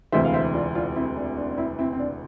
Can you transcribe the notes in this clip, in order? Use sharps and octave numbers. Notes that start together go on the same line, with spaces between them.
E1 D2 C3 E3 C5 E5
F5
C5 E5
D4 F4
D4 F4
C4 E4
D4
D4
D4
C4 E4
C4 E4
C4
D4